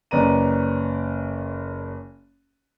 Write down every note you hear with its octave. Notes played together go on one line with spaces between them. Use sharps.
F#1 C#4 B4 D5 A#5 D#7